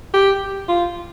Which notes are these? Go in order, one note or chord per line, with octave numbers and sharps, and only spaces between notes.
G4
F4